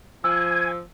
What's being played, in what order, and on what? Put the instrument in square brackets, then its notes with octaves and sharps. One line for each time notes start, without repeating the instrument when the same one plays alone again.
[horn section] F3 [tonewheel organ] G#5 [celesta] E6